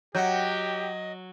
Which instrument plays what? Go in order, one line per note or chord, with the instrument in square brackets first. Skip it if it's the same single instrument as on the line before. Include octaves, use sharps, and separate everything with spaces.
[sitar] F#3 [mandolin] F#4 G5 [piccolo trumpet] G4 [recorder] D#5